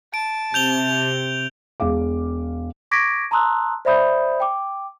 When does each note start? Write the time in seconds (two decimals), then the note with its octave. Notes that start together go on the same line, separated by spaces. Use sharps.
0.14 A5 D7
0.54 C3 G6 F7 G7
1.80 E1 F5 D6
2.91 C#6 D6 G#6 A#6 B6 D7
3.31 A5 A#5 C6 D#6 E6 F#6
3.85 C5 D5 E5 B5 D#6 G6
4.40 G5 D6